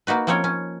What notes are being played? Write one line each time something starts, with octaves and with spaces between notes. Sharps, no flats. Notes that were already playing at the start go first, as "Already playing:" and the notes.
A#3 D#4 F#4 B4
F3 A#3 C4 C#4 C#5
C#4